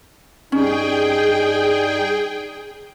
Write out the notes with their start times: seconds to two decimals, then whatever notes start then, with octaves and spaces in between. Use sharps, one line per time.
0.52 G2 C#4 D#4 G#4 G5